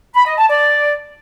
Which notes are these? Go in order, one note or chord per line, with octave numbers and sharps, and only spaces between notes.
B5
D#5
A5
D5